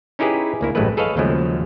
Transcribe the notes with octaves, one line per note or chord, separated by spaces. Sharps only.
C#4 D#4 E4 G4 G#4 B4
D2 A#3 E4
A1 G2 F#3 G#3 A3 B4
G#4 A4 B4 C#5 D#5 F5
D#2 C#3 F3 F#3 G#3 A3